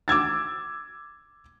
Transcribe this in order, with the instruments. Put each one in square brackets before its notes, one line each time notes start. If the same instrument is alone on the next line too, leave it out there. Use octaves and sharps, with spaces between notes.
[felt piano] D6 E6 G#6 A6